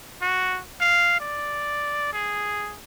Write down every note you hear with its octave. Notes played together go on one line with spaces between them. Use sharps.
F#4
F5
D5
G#4